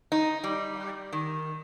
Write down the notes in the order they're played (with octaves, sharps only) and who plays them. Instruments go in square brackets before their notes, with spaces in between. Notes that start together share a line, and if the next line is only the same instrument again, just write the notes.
[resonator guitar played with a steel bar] D#4
G3
D#3